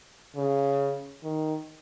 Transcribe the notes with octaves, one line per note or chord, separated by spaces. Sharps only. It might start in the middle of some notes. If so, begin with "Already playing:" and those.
C#3
D#3